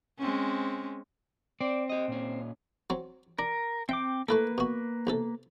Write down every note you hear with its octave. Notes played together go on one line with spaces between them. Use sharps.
G#3 C4 C#4
C4 D5
G4 D#5
A#2 C#4
F#3 C4
D4 A#4
C4 E5 G5 D6
A3 A#3 E4 A4 B4
B2 F#4
B1 C3 A4